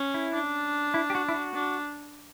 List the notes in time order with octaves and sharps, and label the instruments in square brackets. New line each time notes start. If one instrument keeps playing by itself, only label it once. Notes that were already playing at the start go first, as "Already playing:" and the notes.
Already playing: [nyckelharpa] C#4
[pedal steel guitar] E4
[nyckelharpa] D4
[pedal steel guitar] E4
G4
F#4
E4
F#4
[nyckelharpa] D4